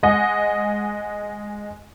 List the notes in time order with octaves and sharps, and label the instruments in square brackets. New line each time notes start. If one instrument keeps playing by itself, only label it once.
[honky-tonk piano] G#3 D#5 F#5